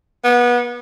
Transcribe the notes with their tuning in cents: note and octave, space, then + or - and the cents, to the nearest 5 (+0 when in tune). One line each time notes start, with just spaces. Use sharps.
B3 -25